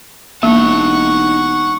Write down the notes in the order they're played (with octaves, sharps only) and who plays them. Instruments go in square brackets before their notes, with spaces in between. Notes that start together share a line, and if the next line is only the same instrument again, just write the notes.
[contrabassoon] E1 [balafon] A#3 [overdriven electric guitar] D#4 A5 [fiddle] F#5 C#6